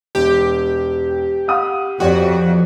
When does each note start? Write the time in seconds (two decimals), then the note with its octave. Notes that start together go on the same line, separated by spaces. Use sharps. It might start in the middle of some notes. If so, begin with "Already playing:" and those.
0.15 E1 G4
1.48 F5 F#5 D#6
2.00 F2 F#4 G4 C#5 D5